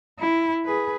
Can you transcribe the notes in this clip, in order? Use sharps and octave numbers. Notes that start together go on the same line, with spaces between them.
E4
G#4 B4